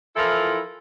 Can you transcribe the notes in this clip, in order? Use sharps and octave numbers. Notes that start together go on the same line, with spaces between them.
E3 F3 E4 F4 A4 A#4